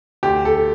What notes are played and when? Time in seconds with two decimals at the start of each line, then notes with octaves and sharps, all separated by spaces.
0.23 D2 G4
0.45 A4